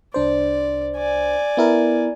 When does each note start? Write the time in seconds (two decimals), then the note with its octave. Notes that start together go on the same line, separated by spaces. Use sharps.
0.14 C2 D4 C5 D5
0.97 D5 G#5
1.57 B3 E4 A#4